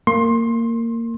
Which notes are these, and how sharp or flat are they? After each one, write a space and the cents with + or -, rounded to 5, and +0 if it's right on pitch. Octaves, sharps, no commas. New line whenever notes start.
A#3 -20 C6 +25